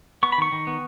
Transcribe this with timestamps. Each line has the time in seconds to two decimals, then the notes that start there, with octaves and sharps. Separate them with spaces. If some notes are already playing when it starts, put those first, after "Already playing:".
0.23 B3 C#6
0.32 B5
0.38 D#3 C#6
0.52 D#3
0.67 B3